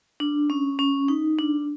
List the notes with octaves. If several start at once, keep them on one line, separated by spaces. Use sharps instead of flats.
D4
C#4
C#4
D#4
D4